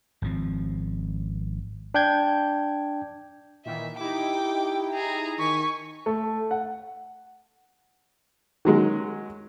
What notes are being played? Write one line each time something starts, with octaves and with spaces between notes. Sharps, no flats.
G#1 F3 C4
D4 G5 G6 G#6
A#2 D#3 E3 E5
D#4 E4 G4 G5 D6
G#4 A#5
D#3 G#5 C#6 B6
A3
F#5
D#3 F#3 G#3